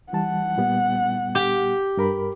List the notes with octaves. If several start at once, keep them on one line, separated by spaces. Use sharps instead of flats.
E3 G3 F#5 A5
A#2 G3 B3
G4
G2 A#4 B5